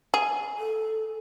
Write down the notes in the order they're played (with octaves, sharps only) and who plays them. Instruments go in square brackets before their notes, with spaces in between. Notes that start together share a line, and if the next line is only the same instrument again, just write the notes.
[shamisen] G#4
[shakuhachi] A4